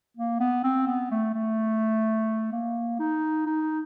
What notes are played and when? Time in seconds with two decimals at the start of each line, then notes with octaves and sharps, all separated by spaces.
0.17 A#3
0.40 B3
0.64 C4
0.87 B3
1.11 A3
1.35 A3
2.52 A#3
3.00 D#4
3.46 D#4